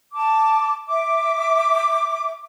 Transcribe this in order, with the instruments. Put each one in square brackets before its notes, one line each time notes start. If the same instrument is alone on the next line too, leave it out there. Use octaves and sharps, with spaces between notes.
[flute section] A5 D6
E5 D6